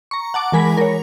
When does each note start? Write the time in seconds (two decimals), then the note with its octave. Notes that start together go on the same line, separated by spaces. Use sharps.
0.11 A#5 C#6
0.34 F#5 A5 D6
0.52 E3 G#3 A#4 G#5 B5 B6
0.77 A#4 C#5